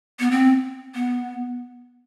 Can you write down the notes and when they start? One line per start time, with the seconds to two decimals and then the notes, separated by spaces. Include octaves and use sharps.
0.20 B3
0.31 C4
0.95 B3